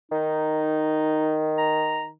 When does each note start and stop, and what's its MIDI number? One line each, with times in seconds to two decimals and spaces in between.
0.12 2.13 51
0.12 1.46 63
1.58 2.07 82